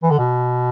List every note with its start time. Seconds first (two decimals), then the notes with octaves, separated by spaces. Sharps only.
0.03 E3
0.11 D3
0.19 B2